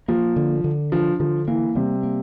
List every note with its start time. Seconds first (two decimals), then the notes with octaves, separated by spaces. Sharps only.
0.08 F3 A#3
0.36 D3
0.64 D3
0.92 F3 D4
1.20 D3 F3
1.48 E3 A#3
1.75 C3 G3
2.03 A#3